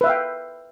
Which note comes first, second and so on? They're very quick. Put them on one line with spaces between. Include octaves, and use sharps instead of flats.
B4 E5 F5 G5